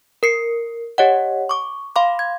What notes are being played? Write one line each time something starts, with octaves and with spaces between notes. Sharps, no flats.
A#4 C7 C#7
G4 C#5 D#5 F#5
C#6 D6
F5 B5 C6 D6
G#6